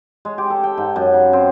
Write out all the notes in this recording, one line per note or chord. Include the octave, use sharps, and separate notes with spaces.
G#3
G4
A4
G5
G#2
F#2
C#3
C4